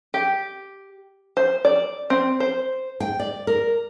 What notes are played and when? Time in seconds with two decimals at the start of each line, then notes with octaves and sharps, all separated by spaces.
0.14 G4
1.37 C5
1.65 D5
2.10 C4
2.40 C5
3.00 G5
3.20 D5
3.47 A#4